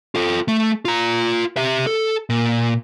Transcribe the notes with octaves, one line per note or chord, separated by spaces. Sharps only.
F4 A4
A3
F4 A#5
G4 E5
A4
A#2